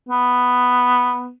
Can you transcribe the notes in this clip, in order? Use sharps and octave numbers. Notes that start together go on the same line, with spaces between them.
B3